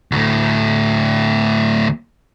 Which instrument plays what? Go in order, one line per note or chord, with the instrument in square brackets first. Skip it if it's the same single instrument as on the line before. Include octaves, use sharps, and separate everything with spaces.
[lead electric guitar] D2 A2